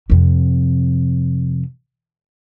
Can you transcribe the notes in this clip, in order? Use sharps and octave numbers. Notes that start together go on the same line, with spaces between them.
F2 C3